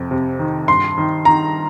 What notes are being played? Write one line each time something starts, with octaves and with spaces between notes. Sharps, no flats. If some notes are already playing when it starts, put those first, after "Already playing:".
Already playing: F2 C3
C3
D#3
G2 C6
D#3
D#3 A#5